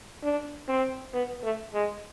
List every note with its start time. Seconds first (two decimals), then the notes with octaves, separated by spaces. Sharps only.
0.24 D4
0.69 C4
1.14 B3
1.44 A3
1.74 G#3